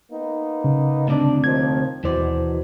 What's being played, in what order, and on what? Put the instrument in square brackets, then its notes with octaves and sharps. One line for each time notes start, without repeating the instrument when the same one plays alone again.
[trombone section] A#3 B3 D#4
[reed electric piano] C#3
[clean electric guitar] D2 C3 D5 [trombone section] D4
[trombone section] D#2 D#3 F3 [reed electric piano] G#6
[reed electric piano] D#2 C5 [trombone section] B2 [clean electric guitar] E3 D5